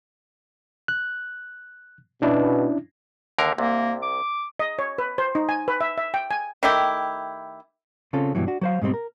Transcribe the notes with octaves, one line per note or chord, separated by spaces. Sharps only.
F#6
B2 C#4 D4 E4
D#2 D3 A#4
C2 C3 A#3
D6
D#5
C#5
B4
C5
D#4
G#5
B4
E5
E5
G5
G#5
D#3 A3 E4 G4
C#3 C4 C#4 F4 A4
G2 B2 E3 F#3
D4 F#4
F#3 C5 F5
G#2 B2 G3 C4
A#4